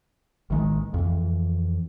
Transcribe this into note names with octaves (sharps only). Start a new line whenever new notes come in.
A1 D#3 G#3
F2 E3